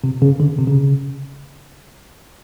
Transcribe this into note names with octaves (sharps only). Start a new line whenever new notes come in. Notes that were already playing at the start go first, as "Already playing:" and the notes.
C3
C#3
D3
C3
C#3